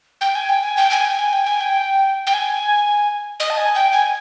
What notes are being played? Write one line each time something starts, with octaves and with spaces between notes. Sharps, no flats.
G5
G#5
G5
G#5
G5
G#5
G5
G#5
G5
G#5
G5
G5
G#5
D#5
A5
G#5
G5
G#5